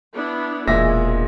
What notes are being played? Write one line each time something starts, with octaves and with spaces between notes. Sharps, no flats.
B3 D4 E4
E1 A#2 G#3 E5 A#6